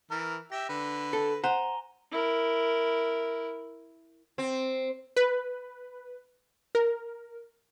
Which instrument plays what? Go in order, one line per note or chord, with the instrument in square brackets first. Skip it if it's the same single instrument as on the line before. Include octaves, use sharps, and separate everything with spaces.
[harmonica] E3 A#4
[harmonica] G4 E5 [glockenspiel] A#6 E7
[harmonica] D3 B4
[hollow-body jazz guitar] A4
[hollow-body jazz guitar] C5 F#5 [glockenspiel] G#5 A#5 G7
[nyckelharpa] E4 A#4
[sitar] C4
[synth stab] B4
A#4